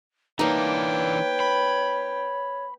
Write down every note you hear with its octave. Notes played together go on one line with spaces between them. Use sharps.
E3 A#3 D4 D#4 B4 C#5 G5
B5